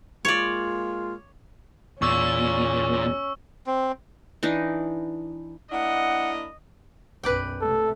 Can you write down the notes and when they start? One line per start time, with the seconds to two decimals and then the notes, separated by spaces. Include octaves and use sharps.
0.25 G#3 A#3 F4 C#5 D5
2.02 E2 A#2 C#4 C#6 E6
3.66 C4
4.43 E3 D4 D#4
5.72 A#3 D4 E4 D#5 F#5
7.23 B1 F#2 B4 D5 G5
7.61 C3 A3 A4